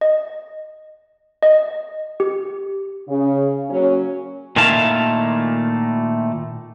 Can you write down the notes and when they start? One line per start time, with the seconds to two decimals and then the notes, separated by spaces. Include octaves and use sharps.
0.01 D#5
1.43 D#5
2.20 G4
3.08 C#3
3.70 C#3 F#3 A#3 C#4
4.56 A#2 D#3 A3 E4 F5 A5